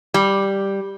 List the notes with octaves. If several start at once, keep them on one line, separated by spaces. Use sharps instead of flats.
G3